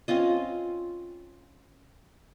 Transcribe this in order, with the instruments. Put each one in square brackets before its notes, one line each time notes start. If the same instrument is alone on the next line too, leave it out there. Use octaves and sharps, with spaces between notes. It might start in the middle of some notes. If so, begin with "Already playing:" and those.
[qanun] C4 C#4 F4 D#5